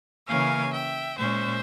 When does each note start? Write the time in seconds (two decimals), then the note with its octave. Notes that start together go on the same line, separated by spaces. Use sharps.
0.27 C#3 E3 A#3 C#4 F5 G#5
0.72 E5 G5
1.17 A#2 G#3 C#4 C5 E5